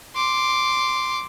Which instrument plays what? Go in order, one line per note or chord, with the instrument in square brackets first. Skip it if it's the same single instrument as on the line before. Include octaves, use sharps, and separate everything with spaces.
[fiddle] C6 D6